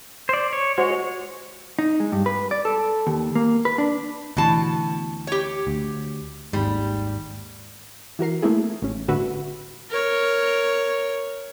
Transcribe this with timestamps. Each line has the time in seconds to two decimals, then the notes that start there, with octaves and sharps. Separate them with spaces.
0.29 C5 D5
0.53 C#5
0.78 G#3 F#4 C5 C#5
1.79 D#4
2.00 G#3
2.12 G2
2.26 B4
2.51 D5
2.65 A4
3.07 D#2
3.36 A#3
3.65 B4
3.78 D4
4.37 D2 B2 E3 A5
5.27 G4 C#5
5.67 D2
6.53 G#1 D#2 G#2 G3
8.19 E3 F#4 A#4 C7
8.42 A3 A#3 C4 E4 G#4
8.82 A1 C#4
9.08 G1 A2 D3 F#4 B4 E5
9.90 A#4 C#5